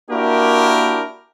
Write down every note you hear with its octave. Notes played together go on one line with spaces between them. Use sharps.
A#3 D4 E4 F#4 G4 A#4